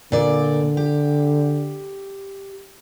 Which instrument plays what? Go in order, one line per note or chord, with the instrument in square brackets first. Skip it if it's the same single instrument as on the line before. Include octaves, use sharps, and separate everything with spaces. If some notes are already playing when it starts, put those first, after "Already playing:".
[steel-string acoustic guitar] A#2 D5 [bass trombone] D3
[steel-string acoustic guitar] G4